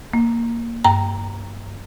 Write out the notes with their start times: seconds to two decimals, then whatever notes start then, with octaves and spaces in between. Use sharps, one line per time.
0.13 A#3
0.84 G2 G5 A#5